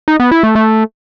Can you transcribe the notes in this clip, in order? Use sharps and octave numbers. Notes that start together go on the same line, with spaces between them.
D#4
B3
E4
A3
A3